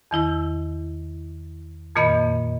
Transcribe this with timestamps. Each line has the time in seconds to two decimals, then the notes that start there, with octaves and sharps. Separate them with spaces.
0.11 E2 D#3 E4 E6
1.96 F2 A#2 D#3 A#3 D#5 B5